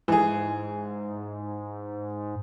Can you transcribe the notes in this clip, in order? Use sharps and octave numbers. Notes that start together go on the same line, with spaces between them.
G#2 E3 G#4